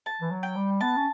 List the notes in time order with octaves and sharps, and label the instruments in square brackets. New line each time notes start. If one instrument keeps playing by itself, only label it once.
[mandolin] A5
[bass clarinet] E3
F#3
[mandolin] G5
[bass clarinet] G3
[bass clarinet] B3 [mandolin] A5
[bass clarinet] C#4